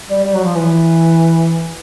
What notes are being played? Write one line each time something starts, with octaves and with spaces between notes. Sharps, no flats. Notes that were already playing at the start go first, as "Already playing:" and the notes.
G3
G3
F#3
F3
E3